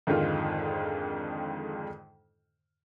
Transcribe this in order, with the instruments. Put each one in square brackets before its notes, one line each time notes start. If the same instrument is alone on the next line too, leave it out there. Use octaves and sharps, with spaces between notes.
[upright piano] F2 G#2 D3 D#3 D#4 F4